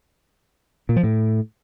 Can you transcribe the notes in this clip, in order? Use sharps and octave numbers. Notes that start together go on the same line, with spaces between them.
A#2
F3
A2